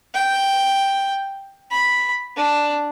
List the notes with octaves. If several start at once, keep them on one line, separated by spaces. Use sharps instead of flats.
G5
B5
D4